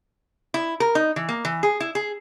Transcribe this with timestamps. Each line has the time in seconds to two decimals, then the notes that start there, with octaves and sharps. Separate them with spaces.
0.54 E4
0.80 A#4
0.95 D#4
1.16 E3
1.29 A#3
1.45 E3
1.63 G#4
1.80 E4
1.95 G#4